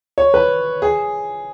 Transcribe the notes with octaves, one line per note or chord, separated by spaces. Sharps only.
C#5
B4
G#4